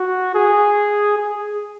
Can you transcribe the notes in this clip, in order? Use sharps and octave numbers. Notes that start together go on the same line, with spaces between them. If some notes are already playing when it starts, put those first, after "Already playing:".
Already playing: F#4
G#4
G#4